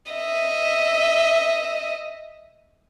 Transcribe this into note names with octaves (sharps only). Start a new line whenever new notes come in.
D#5 E5